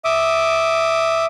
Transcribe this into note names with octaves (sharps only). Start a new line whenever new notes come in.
E5 D6 D#6